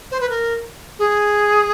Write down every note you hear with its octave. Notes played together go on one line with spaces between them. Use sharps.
C5
B4
A#4
G#4